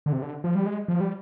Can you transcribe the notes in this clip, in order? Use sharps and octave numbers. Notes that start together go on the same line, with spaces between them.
D3
C3
D3
F3
G3
G#3
F3
G3